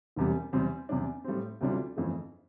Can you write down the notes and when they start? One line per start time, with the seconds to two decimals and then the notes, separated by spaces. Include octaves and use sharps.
0.16 E1 E2 C3 G3
0.53 E2 C3 G3 C4
0.89 E2 C3 G3 D4
1.24 A2 G3 C4
1.61 D2 C3 G3 D4 F4
1.97 G1 F2 E3 A3